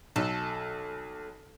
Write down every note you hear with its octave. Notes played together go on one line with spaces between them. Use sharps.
B1 A4